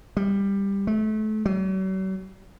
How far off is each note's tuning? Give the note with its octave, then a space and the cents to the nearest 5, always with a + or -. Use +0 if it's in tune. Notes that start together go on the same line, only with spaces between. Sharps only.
G3 +15
A3 -30
F#3 +45